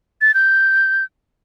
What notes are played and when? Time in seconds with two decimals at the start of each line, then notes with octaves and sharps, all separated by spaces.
0.21 A6
0.34 G6